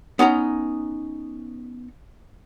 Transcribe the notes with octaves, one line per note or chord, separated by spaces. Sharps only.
B3 C#4 D#4 A#5